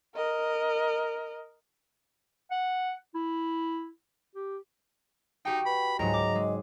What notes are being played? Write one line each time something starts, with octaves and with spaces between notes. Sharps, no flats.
A#4 D#5
F#5
E4
G4
D#4 F#4 G4 G5
B4 B5
C#2 G#2 F#3 D#5 A#5
D6
G#3